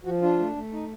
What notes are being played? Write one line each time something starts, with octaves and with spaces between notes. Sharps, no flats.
F3 F#4
D4 F4
A3
A3
D#4